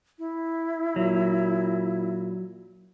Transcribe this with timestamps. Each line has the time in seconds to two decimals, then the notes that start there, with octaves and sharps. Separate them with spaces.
0.19 E4
0.96 A#2 F#3